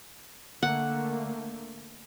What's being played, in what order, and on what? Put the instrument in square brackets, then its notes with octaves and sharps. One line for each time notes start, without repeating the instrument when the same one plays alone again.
[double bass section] D3 A3 A#3 [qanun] F#5